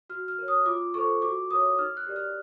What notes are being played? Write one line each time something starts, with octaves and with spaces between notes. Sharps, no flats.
F#4 F6
F6
A#4 C#5
D#6
F4 D6
A4 C5 C#6
F#4 D6
A#4 C#5 D#6
D#4 F6
F#6
G4 A#4 D5
F6